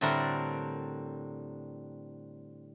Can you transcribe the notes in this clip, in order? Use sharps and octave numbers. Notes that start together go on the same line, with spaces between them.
A2 D3 G3 C4 D4 A#4